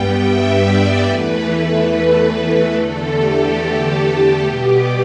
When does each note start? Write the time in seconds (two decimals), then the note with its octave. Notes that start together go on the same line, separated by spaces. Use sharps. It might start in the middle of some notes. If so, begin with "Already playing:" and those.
Already playing: G2 G3 B3 G5
0.20 E5
0.63 D5
1.04 E2 E3 A3 B4
1.47 B4
2.31 B4
2.73 E2 D3 A3 A4
3.15 G4
4.42 B2 G3 B3